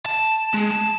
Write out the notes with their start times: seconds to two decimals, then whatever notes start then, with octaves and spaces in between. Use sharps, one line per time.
0.06 A5
0.54 G#3
0.71 A5